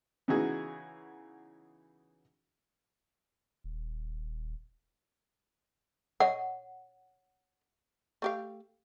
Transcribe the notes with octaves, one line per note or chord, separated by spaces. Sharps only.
C#3 E3 B3 D#4 F#4 G#4
D#1
C#5 D#5 F#5
A3 G4 F5